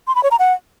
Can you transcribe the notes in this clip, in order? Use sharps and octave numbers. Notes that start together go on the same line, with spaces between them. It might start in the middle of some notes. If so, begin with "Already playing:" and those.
C6
B5
C#5
A#5
F#5